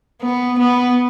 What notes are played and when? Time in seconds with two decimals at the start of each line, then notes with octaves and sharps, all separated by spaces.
0.22 B3
0.59 B3